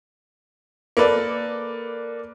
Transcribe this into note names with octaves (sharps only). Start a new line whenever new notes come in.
A#3 A4 B4 D5